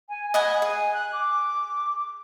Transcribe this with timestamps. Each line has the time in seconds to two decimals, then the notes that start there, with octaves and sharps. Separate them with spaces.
0.09 G#5
0.34 D#5 F#5 G#5 B5
0.62 G#4 G#5
0.93 F#6
1.13 D6